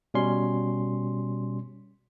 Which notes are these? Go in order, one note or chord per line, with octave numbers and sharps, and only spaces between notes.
B2 G3 C#4 C6